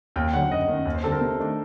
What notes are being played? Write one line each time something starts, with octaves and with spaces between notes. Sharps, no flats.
D#2 G5
D3 F#3 F#5
F#1 D#5
F#2 D#3
D#2
C5
D3 G3 C4 A4
A#4
C3
D#3 A3 D4